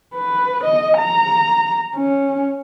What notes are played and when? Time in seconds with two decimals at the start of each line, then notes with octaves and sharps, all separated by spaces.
0.14 B4
0.64 D#5
0.98 A#5
1.96 C#4